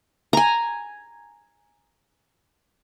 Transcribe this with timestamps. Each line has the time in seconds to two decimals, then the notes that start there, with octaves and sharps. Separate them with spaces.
0.33 G#5 A#5